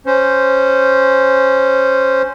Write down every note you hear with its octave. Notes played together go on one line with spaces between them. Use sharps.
C#4 C5